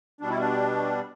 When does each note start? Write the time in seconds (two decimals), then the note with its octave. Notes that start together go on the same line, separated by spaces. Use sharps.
0.21 B2 G3 D4
0.29 E4
0.39 D4